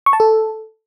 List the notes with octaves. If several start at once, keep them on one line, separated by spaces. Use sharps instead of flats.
C#6
A5
A4